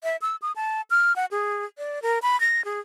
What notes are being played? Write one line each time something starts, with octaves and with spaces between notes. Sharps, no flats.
E5
E6
D#6
A5
F6
F#5
G#4
D5
A#4
B5
A#6
G#4